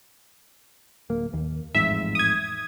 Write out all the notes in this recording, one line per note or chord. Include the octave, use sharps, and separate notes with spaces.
D1 A#3
D#2
A1 F2 G#2 E5
D#6 G#6